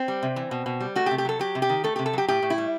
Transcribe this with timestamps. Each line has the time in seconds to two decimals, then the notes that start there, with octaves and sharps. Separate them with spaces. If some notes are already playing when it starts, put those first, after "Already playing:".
Already playing: C4
0.08 G3
0.23 C3
0.36 E3
0.51 B2
0.66 B2
0.80 G3
0.95 A3 F#4
1.06 G4
1.11 C3
1.18 G4
1.25 F#3 A4
1.39 F#3 G4
1.55 C3
1.62 G4
1.69 D#3
1.84 A3 A4
1.96 C3 G4
2.06 A4
2.13 F#3 G4
2.28 A2 G4
2.42 A2
2.50 E4
2.58 G3